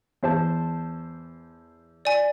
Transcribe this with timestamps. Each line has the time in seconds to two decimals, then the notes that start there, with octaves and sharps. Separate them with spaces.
0.23 E2 C5 A5
2.05 D5 G#5